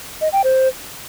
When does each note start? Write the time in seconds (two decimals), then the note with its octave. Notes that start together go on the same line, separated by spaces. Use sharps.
0.21 D#5
0.33 G5
0.44 C5